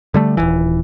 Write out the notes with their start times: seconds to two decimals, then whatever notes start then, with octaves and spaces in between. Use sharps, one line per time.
0.14 D3 G3 A3
0.37 D#1 G#1 E3